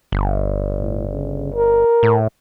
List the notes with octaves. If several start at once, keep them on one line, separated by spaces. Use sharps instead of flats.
G1
A2
C#3
A#4
A2